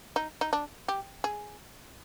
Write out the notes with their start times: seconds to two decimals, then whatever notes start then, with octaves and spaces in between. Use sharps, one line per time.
0.16 D#4
0.41 D#4
0.53 D4
0.88 G4
1.24 G#4